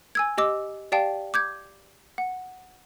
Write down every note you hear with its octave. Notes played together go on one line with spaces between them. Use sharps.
G#5 E6 G#6
G4 D#5 D6 E6
G4 D5 F5 G5 A5
D6 G6 G#6
F#5